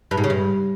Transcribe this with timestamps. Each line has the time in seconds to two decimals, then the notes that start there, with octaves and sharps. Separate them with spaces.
0.11 G2
0.17 G#2
0.24 C#3
0.30 G2